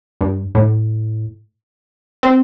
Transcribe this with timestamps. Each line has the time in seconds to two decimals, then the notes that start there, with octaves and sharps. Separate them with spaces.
0.21 G2
0.55 A2
2.23 C4